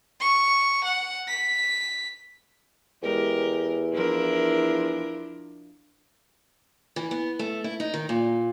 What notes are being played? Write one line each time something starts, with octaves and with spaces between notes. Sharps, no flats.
C#6
F#5
B6
E2 G#3 G4 A#4
F3 D4 E4 A#4
E3
B3
A3
E4
D#4
D#3
A#2